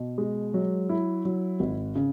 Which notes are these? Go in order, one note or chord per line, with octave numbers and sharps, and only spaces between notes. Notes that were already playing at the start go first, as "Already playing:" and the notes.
Already playing: B2
G#3
F#3
E4
F#3
G#1
C#3